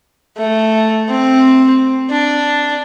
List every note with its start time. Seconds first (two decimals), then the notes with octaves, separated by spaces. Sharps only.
0.37 A3
1.09 C4
2.11 D4